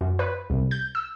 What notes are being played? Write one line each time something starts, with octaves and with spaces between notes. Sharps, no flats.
F#2
B4
C2
G6
E6